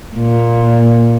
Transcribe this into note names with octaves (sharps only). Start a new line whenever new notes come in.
A#2